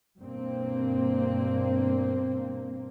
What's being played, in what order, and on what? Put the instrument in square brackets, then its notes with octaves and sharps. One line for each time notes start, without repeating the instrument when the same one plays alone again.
[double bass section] G2 B2 A#3 C4